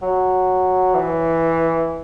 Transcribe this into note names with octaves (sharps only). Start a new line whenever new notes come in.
F#3
E3